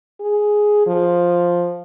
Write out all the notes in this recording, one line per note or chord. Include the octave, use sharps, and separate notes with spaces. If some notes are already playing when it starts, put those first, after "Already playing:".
G#4
F3